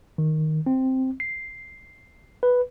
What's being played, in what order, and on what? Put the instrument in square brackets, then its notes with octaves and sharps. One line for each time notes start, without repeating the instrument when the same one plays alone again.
[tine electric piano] D#3
C4
C7
B4